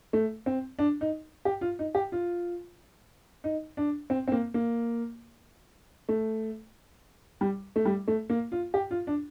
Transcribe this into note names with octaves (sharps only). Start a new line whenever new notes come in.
A3
C4
D4
D#4
G4
F4
D#4
G4
F4
D#4
D4
C4
C4
A#3
A#3
A3
G3
A3
G3
A3
A#3
F4
G4
F4
D4